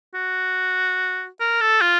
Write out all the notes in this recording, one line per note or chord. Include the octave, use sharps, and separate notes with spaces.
F#4
A#4
A4
F4